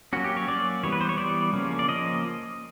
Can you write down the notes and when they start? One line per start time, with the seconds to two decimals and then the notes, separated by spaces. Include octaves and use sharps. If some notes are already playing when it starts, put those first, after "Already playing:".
0.13 F#3 A#3 C#4 F#4
0.24 G4
0.37 C#5
0.48 F#3 A#3 C#4 D5
0.83 E3 G3 B3 C#5
0.92 B4
1.01 C5
1.09 C#5
1.18 E3 G3 B3 D5
1.53 C#3 F3 A#3 C#4
1.79 D5
1.88 F3 A#3 C#4 D#5